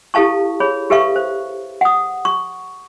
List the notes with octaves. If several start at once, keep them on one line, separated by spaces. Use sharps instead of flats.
E4 G4 A4 F5 A5 C#6
G#4 C#5 B5
G4 A4 B4 E5 F5 C#6
C5
F#5 D#6
C#6